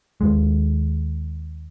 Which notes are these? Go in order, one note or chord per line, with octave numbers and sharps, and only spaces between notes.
D#2 G#3